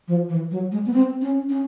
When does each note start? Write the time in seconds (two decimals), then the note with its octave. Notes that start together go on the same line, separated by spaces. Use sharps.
0.08 F3
0.29 E3
0.51 F#3
0.72 G#3
0.86 B3
0.93 C4
1.22 C#4
1.50 C#4